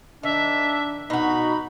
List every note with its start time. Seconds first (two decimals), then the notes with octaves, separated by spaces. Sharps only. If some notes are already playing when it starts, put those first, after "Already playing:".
0.23 D#3 D4 E5
1.10 B2 D#4 F#4 B5